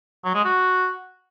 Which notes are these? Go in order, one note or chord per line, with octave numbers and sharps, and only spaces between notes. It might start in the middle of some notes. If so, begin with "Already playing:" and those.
F#3
G#3
F#4